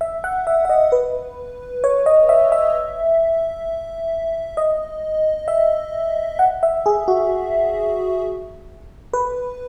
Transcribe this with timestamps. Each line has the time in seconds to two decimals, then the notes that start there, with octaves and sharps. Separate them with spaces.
0.01 E5
0.24 F#5
0.47 E5
0.65 E5
0.69 D#5
0.92 B4
1.84 C#5
2.06 D#5
2.29 E5
2.52 E5
4.57 D#5
5.48 E5
6.39 F#5
6.63 E5
6.86 G#4
7.08 F#4
9.13 B4